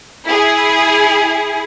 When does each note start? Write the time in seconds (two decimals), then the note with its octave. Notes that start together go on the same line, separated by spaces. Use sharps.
0.25 E4 G#4